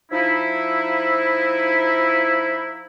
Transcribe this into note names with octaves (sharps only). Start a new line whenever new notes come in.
F3 D#4 E4